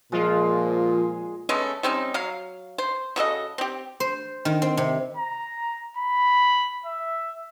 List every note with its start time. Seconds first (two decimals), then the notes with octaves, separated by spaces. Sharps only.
0.12 A#2 F3 G#3 F4
1.49 G#3 A3 B3 C#4
1.83 G3 C4 C#4 D#4
2.14 F#3 F5
2.78 C5
3.16 C#3 F#4 A4 D#5
3.58 C4 G4
4.00 C5
4.45 D#3
4.62 C4
4.77 C3
5.17 A#5
5.97 B5
6.86 E5